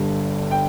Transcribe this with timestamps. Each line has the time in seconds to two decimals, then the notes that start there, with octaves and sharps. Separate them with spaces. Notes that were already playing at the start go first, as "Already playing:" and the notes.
Already playing: G1 G2 G3
0.51 G5